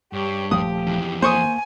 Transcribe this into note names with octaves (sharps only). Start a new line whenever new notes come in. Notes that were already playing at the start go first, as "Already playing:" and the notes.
G2 G4 C#5
D#1 F3 A3 G4 D#6
F2 E3
A#3 C5 G#5 C#6 D#6